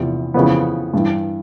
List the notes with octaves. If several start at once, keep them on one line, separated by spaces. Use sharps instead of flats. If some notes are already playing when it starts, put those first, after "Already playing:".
Already playing: E2 C3 F3
F2 C#3 E3 B3
G2 E3